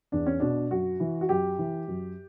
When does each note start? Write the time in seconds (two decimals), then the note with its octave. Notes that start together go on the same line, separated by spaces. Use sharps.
0.12 E2 D4
0.26 C#4
0.40 B2 D4
0.71 F#2 F#4
1.00 E3
1.21 F#4
1.29 F#2 G4
1.58 E3
1.88 F#2